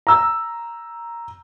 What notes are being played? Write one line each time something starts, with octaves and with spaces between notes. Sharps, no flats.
A#5 E6